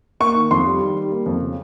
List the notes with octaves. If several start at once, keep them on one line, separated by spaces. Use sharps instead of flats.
A#3 C#6
D#3
F2 C6
G3
D#3
G3
A#3
F2
C#3